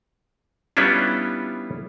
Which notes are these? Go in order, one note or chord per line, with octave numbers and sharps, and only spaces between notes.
G3 B3 C#4 D4 E4 F4